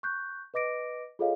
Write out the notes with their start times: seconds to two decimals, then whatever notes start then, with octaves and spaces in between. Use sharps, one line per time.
0.03 C#6 F#6 G6
0.54 B4 D#5 D6 A#6 D7
1.19 F4 G#4 A4 C#5 D#5 F5